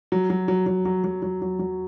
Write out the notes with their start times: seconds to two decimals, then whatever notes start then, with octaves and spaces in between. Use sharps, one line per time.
0.12 F#3
0.30 F#3
0.48 F#3
0.66 F#3
0.85 F#3
1.04 F#3
1.22 F#3
1.42 F#3
1.59 F#3